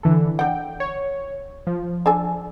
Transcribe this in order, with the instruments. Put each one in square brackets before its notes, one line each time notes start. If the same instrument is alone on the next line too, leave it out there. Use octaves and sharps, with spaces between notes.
[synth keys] D3 E3 A4
[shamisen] D4 F#5 [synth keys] G5
[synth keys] C#5
F3
[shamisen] D4 A4 G#5